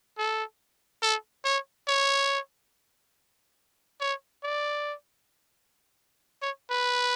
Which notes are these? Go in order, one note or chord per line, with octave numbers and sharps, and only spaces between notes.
A4
A4
C#5
C#5
C#5
D5
C#5
B4